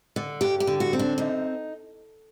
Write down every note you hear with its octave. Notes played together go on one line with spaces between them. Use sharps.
D3
G2 G4
G4
D3
F#4
C4
D4
F#2 D#4